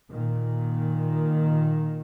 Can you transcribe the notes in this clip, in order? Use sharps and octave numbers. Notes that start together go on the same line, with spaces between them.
A#2 D#3